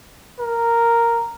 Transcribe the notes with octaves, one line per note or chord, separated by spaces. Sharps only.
A#4